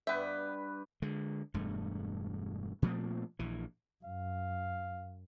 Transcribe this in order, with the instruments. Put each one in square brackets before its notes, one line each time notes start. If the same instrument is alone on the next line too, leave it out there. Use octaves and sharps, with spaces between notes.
[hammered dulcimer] G2 B4 G5 [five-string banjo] B3 E5
[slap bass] D3 G#3
E1 G2 A3
A#2 F3 A3 C4
A#1 E3
[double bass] F#2 [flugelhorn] F5